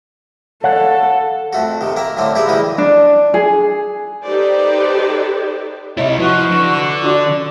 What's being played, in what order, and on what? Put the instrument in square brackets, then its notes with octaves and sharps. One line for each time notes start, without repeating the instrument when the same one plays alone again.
[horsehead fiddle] A4 [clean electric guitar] C#5 F5 F#5
[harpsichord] F2 A3 F#4
C3 D#3
A#3 A#4 E5
A2 D3 A#3 C4
E4 G4 G#4 B4
D2 E3 G3 A#3 D#4 D#6
[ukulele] D4
G#4
[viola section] D#4 G4 A4 B4 C5 D5
[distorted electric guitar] C2 E4 [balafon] C#5 D#5 E5
[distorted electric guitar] F3 [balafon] E4 [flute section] F#4 B4 C#6
[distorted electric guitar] D3
[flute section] D4 [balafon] F4 F#4 D5